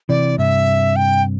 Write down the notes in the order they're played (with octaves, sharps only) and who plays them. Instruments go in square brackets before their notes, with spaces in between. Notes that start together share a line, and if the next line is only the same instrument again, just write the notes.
[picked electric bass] C3 E3 [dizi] D5
[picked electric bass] G2 C3 [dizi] E5
[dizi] G5